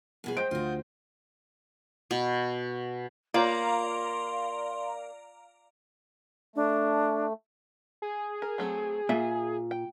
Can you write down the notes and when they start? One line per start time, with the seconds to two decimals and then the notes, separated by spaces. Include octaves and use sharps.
0.24 F#2 B2 G#4
0.37 G#3 C5 D#5 G5 D7
0.51 D2 F4 F#4
2.11 B2
3.34 A#3 F4 C#5 D5 F5 A#5 C6
6.56 A3 D4
8.02 G#4
8.42 A#4
8.58 F#3 A3 C4
9.09 A#2 E5
9.71 G5